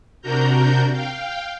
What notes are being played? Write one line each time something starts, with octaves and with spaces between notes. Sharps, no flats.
C3 D4 F#4 A#4 A#5 G6
F5 G5